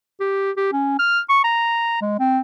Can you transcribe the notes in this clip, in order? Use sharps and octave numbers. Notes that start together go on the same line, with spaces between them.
G4
G4
C#4
F6
C#6
A#5
G#3
C4